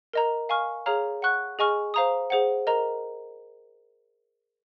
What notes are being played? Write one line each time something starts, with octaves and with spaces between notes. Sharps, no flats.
A#4 D#5 A#5
F5 G#5 C#6 F6
G#4 C#5 F5 A#5 F6
F#5 C#6 F#6
G#4 D#5 G#5 C#6 F6
C5 F5 A#5 D#6
G#4 C5 F#5
A#4 D#5 A#5